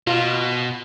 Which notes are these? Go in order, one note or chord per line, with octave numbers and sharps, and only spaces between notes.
B2 F4